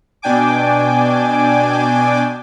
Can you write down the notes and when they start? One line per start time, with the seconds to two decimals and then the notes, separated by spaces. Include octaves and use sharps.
0.22 B2 D4 G5 G#5 D6